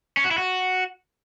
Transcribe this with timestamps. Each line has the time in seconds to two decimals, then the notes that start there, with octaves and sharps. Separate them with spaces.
0.17 C#4
0.24 F#4
0.31 E4
0.38 F#4